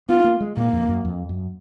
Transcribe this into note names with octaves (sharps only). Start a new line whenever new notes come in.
B3 F4
A#3
G#3
A#2 A#3
F2
F#2
F2
F#2